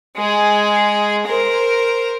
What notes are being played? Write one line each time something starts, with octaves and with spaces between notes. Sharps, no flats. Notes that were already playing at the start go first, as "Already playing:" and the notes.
G#3 G#4
A#4 C5